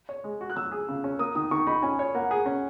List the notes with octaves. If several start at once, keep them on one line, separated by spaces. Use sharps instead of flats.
C#5
G#3
F#4
F#6
F#3 E6
G#4
C#3
C#4
A#3 D#6
D#3 D#6
D#3 C#6
D#4 B5
C#4 G#5
C#5
A#3 F#5
G#4
C#4